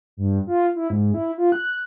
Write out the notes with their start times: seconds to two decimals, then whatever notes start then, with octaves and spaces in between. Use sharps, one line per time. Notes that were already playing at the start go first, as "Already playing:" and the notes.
0.17 G2
0.47 F4
0.76 E4
0.90 G#2
1.14 E4
1.38 F4
1.52 F#6